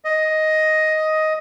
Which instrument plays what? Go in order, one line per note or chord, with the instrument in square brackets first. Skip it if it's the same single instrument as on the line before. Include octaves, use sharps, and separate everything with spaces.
[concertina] D#5